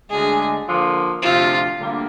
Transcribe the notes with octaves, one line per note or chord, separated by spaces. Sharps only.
D2 D3 G#3 G#4
D3 F3 A#3
D2 C3 F3 F4
D2 D3 G3 A#3